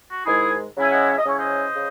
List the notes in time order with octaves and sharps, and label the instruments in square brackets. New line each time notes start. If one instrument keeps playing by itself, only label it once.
[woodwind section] F#4
G#2 D#3 G#3 E4 G#4
C#3 F#3 C#4 E4
G#5
D#5 F#5
E5
D#5
C#3 F#3 C#4 E4 C#5
C5 D#5
C#3